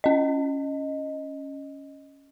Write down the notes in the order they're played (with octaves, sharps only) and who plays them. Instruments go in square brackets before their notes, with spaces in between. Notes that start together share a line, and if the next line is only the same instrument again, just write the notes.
[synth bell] C#4 D#5